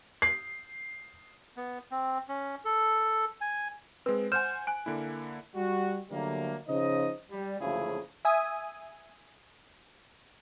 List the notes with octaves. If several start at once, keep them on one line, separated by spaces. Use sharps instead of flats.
C7
B3
C4
C#4
A4
G#5
G#3 C4 B4
C5 F#5 G#5 F6 G6 E7
G#5 F#6 D7
D3 A#3 E4
G3 F#4
D3 F#3 G3 A3 A#3
C#3 F3 D#4 C5 D#5
G3
F#1 D2 C#3 F3 E4 G#4
E5 G#5 D#6